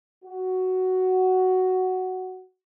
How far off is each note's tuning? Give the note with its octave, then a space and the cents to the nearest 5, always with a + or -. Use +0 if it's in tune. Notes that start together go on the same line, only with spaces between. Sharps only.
F#4 +5